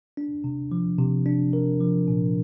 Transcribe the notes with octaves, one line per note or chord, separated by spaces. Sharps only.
D4
C3
F3
C3
D4
A#4
F3
A#2